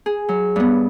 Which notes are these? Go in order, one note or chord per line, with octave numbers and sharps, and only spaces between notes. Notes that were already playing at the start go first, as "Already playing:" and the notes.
G#4
F#3
G2 B3